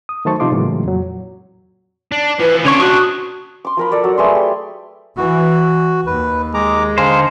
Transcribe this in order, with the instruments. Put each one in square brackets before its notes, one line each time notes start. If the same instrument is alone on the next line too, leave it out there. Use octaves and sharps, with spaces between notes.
[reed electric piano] D#6
D#3 F#3 A3 C5 A5 C#6
C3 F3 D#4 F4 C6 D6
A2 C#3 E3 F#3 G#3 A#3
F2 A#2 F#3
[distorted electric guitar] D4
[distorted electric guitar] E3 F3 [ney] B4
[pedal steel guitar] D3 C#5 C#6 [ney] C#4 [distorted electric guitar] D4 F4
[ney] F#4 [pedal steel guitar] C#6 D#6 F#6
[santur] C6 D6
F3 A#4 B5
A4 A#4 D5 A5
F#3
A3 G#4 B4 C6
G4
[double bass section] E3 [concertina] F#4
[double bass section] D#2 [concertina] B4
[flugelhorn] G#3 [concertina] A#5 D6
[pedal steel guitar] D3 C5 [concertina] F5 G#5 A#5